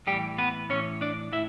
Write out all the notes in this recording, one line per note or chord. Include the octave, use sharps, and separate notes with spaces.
A2 E3 G3 G4
B3 B4
A2 E3 C#4 C#5
D4 D5
A2 E4 E5